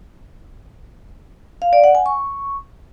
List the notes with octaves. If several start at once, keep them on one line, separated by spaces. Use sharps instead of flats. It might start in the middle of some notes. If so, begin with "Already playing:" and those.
F5
D5
F#5
G#5
C#6